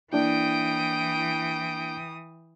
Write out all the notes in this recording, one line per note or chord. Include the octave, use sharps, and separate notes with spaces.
E3 A#3 D4 E4 G5 D#6 D7